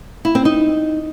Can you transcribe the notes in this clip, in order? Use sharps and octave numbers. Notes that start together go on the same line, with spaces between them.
E4
C4
D#4